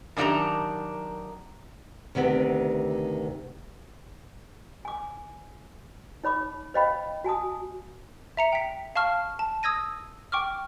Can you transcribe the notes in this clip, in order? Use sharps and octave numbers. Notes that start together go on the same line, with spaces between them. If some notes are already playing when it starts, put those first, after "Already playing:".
F#2 D#3 D4 F4 G4 A#5
D2 C3 D#3 B3 G4
G#5 D6
D#4 C#5 B5 D6
C5 C#5 D#5 F5 G5 B5
F#4 G#5 A5 D#6
E5 A#5 C#7 F7
G5 B6
F5 A5 C#6 F6
A5
D#6 E6 G#6 A#6 D#7
G5 C#6 D6 F6